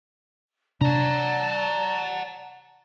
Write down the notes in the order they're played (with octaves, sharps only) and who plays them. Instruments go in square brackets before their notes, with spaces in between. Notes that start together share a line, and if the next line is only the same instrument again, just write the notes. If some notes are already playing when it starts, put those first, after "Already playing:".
[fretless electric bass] C3 D4 [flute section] D5 A5 [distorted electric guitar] F#5 A#5